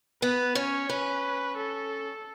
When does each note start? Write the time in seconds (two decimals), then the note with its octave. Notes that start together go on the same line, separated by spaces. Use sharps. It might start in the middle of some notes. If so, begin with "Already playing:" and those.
0.22 B3 B4
0.55 C#4 C#5
0.90 C#4 B4
1.57 A4